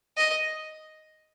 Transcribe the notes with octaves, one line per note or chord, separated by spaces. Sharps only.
D#5